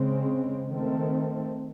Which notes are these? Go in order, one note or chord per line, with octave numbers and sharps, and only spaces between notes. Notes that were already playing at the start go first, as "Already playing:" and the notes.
Already playing: C#3 G#3 C4
D#3 A3 C4